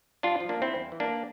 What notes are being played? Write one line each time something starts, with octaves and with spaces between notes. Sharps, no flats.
G2 D4 F4
F3
A#3 D4
G2 C4 E4
E2
E3
A#3 D4